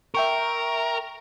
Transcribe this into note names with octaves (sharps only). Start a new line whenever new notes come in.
A#4 E5 G5 C#6